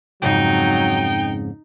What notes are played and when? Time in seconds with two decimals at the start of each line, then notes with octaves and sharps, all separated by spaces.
0.22 F2 G#2 C#3 F#3 D#4 G5